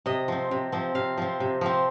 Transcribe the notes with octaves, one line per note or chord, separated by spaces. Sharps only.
C3 D#5
F3 C4
C3
F3 C4
C3 F5
F3 C4
C3
F3 C4